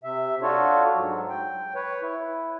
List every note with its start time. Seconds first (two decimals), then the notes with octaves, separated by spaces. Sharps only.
0.04 C3 E5
0.42 D4 F4 F#4 A4 C#5
0.96 G#2 F#3
1.29 G5
1.75 B4 C#5
2.02 E4